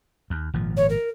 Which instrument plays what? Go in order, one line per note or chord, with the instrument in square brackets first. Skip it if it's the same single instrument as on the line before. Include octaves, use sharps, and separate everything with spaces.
[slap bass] D#2
G#1 A#2 F3
[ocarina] C#5
A#4